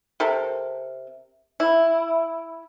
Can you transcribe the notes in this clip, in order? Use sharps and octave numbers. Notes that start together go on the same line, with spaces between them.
C3 A4 A#4
E4